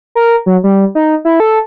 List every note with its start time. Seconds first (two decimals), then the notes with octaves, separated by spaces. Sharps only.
0.15 A#4
0.46 F#3
0.64 G3
0.95 D#4
1.25 E4
1.40 A4